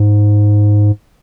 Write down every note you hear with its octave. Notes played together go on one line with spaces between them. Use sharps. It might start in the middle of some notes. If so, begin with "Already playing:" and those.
Already playing: G#2